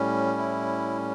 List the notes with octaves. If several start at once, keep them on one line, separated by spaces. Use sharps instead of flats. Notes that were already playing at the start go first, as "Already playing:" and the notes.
Already playing: A2 G3 C#4
E4